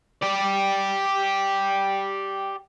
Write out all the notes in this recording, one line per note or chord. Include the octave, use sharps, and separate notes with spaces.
G4 D5